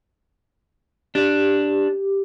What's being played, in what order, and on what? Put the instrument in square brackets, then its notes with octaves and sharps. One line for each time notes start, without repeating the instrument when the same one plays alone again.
[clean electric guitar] D4 [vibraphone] G4